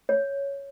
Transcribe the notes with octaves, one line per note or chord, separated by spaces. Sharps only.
C#5